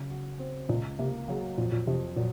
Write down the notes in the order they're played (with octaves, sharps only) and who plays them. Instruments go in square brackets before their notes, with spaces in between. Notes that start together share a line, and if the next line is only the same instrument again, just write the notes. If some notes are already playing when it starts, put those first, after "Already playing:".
Already playing: [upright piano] C#3 F#3
F#4
C4
[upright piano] C#2 [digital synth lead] A#2
[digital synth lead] C3 [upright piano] A#3
[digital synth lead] C#3 [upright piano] F#3
[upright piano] F2 [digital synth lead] A#2
[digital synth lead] A#2
[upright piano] F2 [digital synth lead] C3
[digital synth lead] A#2 [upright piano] F#3